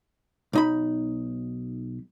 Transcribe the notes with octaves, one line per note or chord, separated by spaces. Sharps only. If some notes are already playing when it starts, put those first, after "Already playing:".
B1 D#4 B5